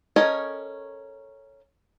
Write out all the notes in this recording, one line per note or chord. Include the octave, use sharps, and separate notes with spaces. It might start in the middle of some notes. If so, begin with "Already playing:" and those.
C#4 A4 A#4 D#5 G#5